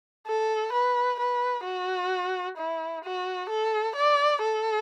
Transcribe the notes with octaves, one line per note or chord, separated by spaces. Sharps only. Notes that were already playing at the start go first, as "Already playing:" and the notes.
A4
B4
B4
F#4
E4
F#4
A4
D5
A4